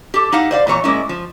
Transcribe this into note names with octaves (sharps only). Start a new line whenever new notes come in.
G4 A4
D#4 E4 F5 F#5
C5 D5 F5
A#2 E3 C#5 A#5
A#2 G#3 A#3 C#4 E4
F3